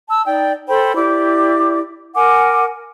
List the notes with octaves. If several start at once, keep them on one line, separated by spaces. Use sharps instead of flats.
A5 E6
D#4 D5 G5
A4 C5 G5 B5
E4 G4 D5 D6
A#4 F#5 G#5 D6